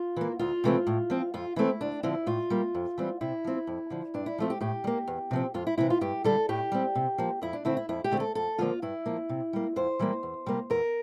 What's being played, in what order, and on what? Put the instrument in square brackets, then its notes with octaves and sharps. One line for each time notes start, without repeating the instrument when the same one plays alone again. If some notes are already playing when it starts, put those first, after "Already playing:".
Already playing: [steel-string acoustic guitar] F4
E3 A#3
D2 F4
C3 E3 A3 C4
A2
F3 C4
F2 F4
E3 A3 C4 E4
D2 D4
D3 F3 C4 E4
A2 F4
G3 A#3
F2
E3 G3 C4
C3 E4
F3 C4
F2
D3 F3
G2 D4
E4
F3 A3 C4 F4
G4
A2 G4
G3
A#3
E2
C3 F3 C4
F2 F4
E4
C3 E3 E4
F4
G2 G4
D3 G3 A4
A2 G4
G3 C4
C3
F3 A#3
F2 E4
D4
D3 A3 C4 E4
E4
F2 E4
G4
D3 A3 C4
A4
F2 A4
D3 F3 A#3 F4
G2 E4
F3 A#3
C3
G3 A#3
F2 C5
E3 G3 A#3
E2
C3 G3 A#3
E2 A#4